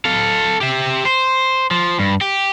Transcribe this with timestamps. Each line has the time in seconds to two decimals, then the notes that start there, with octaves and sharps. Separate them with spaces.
0.05 A4 F5
0.61 G4 E5
1.05 C5
1.71 F3
1.99 G2
2.21 G4